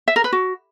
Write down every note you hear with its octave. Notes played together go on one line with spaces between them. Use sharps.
E5
A#4
B4
F#4